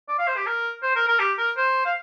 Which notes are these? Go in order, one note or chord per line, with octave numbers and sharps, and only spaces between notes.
D5
F5
C5
G4
A#4
C5
A#4
A#4
G4
A#4
C5
F5